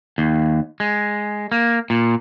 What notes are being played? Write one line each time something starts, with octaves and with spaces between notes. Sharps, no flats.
D#2
G#3
A#3
A#2